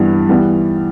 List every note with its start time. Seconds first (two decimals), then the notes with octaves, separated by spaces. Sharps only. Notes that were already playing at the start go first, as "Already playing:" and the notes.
Already playing: G2 E3 G3 B3
0.29 E3 G3 B3